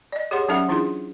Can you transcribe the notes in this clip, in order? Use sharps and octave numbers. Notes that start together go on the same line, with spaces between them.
D5 D#5
G4 G#4 C#5 F#5 C6
F#3 C#4 D#4 A4 E5 F#5
E3 D4 E4 F4 G#4 C6